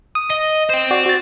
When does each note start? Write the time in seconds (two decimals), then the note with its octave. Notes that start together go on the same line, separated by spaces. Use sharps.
0.15 D#6
0.30 D#5
0.69 C5 G5
0.91 F#4 D5
1.06 F#4 A6